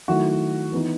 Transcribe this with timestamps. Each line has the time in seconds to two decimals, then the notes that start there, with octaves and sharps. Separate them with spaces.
0.08 D#3 F#3 A3 E4 F#4
0.72 E3 B3 D#4